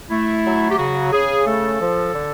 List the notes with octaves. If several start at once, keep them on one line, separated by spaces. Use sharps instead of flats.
A3 E4
F#3
G4
C#3 F#4
C#3 G#4
A3 A4
F3
D3